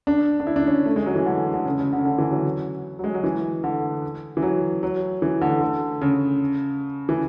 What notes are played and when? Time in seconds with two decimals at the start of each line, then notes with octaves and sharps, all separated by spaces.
0.07 D4
0.40 D4
0.47 E4
0.56 D4
0.67 C#4
0.86 A3
0.96 G#3
1.06 F#3
1.16 E3
1.26 D3
1.54 D3
1.66 C#3
1.79 C#3
1.92 D3
1.99 C#3
2.05 D3
2.18 E3
2.31 F#3
2.99 F#3
3.04 G#3
3.14 F#3
3.24 E3
3.64 D3
4.37 E3
4.42 F#3
4.83 F#3
5.22 E3
5.41 D3
5.61 D3
6.01 C#3
7.09 E3